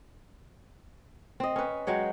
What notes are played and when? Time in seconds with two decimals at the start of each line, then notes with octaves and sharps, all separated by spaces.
1.40 C4 D#5
1.56 C#4 B4
1.87 F#3 G#3 C#5 G5